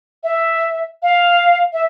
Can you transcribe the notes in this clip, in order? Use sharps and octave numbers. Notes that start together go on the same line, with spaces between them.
E5
F5
E5